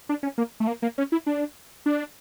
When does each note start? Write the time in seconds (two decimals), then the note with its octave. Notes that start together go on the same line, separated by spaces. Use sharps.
0.09 D4
0.23 C#4
0.38 A#3
0.60 A3
0.67 A#3
0.82 A#3
0.98 C#4
1.12 E4
1.26 D4
1.86 D4